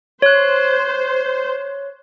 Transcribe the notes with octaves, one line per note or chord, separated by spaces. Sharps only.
C5 C#5 F#6